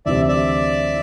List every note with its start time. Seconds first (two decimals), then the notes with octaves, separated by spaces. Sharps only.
0.06 D2 C3 E3 G3 C4 D5 E5
0.28 D5 E5